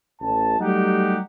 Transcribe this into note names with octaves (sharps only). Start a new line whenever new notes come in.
A1 A5
F#3 G3 A3 D#4 G4 F#5